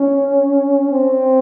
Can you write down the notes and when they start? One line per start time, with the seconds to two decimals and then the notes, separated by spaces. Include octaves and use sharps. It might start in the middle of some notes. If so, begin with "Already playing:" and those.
Already playing: C#4
0.92 C4